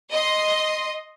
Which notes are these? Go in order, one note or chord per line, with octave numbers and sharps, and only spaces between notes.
D#5 C6